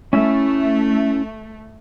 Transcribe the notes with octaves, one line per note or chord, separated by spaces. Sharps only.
A3 C#4 E4 E5